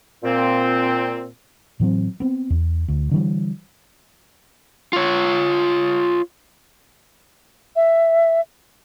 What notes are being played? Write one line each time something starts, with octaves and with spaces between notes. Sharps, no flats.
A#2 C4
A2 E3 F#3 C4
B3 C4
E2
D2
D3 E3 G3
F4 C#5
E5